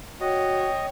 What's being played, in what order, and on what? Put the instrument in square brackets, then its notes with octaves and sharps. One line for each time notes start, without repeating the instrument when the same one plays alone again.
[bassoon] F#4 [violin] C#5 [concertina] D#5 [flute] G5